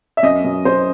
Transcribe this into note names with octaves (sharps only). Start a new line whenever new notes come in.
E5
F#2 D#5
F#2
F#2 C5